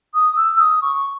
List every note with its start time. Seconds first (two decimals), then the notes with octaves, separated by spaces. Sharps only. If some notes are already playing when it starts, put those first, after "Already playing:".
0.14 D#6
0.36 E6
0.59 D#6
0.82 C#6